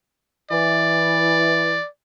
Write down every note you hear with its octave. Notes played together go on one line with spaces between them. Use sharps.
E3 D5